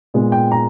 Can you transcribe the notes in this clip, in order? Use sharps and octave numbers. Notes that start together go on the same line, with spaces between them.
A#2 G#3 B3
G5
A#5